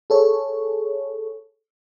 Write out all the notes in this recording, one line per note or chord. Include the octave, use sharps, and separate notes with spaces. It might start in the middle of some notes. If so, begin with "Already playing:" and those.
G#4 A4 C#5